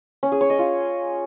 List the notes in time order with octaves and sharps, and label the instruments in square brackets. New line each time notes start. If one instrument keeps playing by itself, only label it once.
[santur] C#4
G#4
C#5
D#5
F4